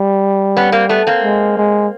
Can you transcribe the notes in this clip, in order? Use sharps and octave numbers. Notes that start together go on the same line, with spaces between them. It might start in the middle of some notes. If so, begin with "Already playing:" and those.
Already playing: G3
B3 C#4
A#3 C4
A3 B3
A#3 C4
G#3
G#3